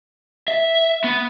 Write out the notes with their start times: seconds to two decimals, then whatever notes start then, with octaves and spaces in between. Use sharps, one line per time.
0.48 E5
1.04 B3